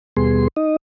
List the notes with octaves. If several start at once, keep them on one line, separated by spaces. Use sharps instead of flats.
D#2 B2 G3 B3 G#4 C6
D#4 D#5